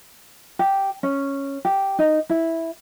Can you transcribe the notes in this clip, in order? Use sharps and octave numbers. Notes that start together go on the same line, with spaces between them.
G4
C#4
G4
D#4
E4